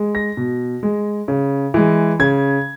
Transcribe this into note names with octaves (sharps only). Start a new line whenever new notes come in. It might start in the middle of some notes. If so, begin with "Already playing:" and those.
Already playing: G#3
A#6
B2
G#3
C#3
E3 G#3
C#3 G#6